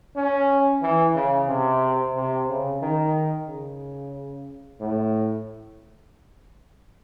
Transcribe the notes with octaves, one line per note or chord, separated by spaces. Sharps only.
C#4
E3
C#3
C3
C3
C#3
D#3
C#3
A2